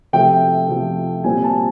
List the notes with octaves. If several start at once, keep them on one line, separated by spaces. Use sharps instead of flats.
C3 F3 A3 G5
C3 F3 A3
A#2 G3 C4 G#5
A5